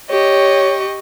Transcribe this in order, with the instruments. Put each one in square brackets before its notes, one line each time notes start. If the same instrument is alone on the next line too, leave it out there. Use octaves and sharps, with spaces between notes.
[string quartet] G4 D#5 C#6 [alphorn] C#5